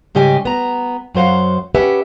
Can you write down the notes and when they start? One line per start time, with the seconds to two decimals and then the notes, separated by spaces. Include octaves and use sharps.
0.15 G#2 C#3 G3 G4 D#5 G#5
0.45 B3 A#5
1.14 F#2 F#3 C5 F5 F#5
1.74 C#4 G4 B4 E5 F#5 G#5